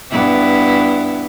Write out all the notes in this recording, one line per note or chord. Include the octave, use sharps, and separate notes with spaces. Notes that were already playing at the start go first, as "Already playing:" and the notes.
G2 B3 E4